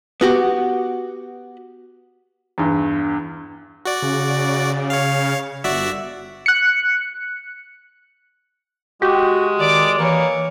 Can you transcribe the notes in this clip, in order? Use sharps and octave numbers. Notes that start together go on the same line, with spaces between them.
B3 F#4 G4
E2 G2
F#4 D5
C#3
C#5 F5
G1 F#4 D5 E5
F#6 C#7
G#3 F#4 G4
D#3 D5 D6
E3 A#3 C#5